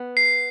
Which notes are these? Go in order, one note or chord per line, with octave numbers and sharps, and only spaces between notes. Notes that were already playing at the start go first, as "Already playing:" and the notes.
Already playing: B3
C7